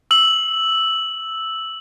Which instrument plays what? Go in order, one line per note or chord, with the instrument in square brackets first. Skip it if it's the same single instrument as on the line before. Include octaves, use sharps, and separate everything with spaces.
[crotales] E6 F#7